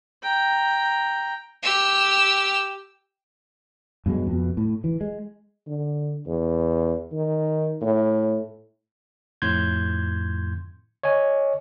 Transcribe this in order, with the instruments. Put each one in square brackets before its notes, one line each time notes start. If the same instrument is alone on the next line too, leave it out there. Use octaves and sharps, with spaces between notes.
[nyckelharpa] G5 A#5
[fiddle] G4 E6
[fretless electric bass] G2 B2 F#3 G#3
F2 B2
A2
E3
G#3
[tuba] D3
E2
D#3
A2
[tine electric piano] F2 A2 C6 G6 G#6
C#5 D#5 G#5